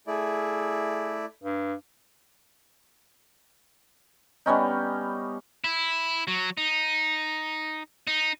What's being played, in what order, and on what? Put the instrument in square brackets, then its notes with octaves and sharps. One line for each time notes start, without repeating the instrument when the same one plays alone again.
[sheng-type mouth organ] A3 E4 D5 [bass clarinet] G#4
[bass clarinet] G2
[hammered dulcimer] G3 B3 C#4 D#4
[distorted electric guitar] E4
F#3
D#4
D#4